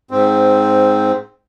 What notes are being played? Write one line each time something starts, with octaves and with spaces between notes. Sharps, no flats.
G#2 C4